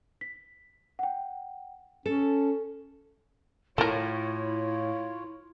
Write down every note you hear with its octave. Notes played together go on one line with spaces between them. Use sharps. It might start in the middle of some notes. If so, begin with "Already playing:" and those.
B6
F#5 G5
C#4 A4 E7
A2 E4 F4 A4 A#4 C#5